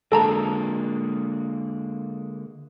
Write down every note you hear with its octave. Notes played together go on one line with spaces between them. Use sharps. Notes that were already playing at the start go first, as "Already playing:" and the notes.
D3 G#3 A#3 A4 A5 A#5